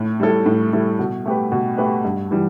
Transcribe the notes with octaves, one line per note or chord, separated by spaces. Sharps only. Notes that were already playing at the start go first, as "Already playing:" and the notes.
Already playing: A2
G3 E4 A4
A2
G3 E4 A4
B2
A3 G4 B4
B2
A3 G4 B4
G2
E3 G3